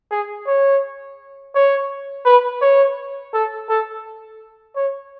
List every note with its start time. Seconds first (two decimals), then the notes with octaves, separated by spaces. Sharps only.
0.11 G#4
0.47 C#5
1.55 C#5
2.25 B4
2.62 C#5
3.33 A4
3.69 A4
4.76 C#5